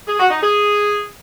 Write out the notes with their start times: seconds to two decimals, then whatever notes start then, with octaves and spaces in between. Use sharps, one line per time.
0.07 G#4
0.19 F#4
0.30 D#4
0.42 G#4